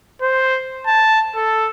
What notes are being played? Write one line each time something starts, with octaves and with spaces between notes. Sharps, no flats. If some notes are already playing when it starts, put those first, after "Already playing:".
C5
A5
A4